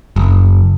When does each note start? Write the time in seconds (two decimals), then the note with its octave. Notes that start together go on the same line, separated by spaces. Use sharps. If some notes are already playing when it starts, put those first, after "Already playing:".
0.16 F#1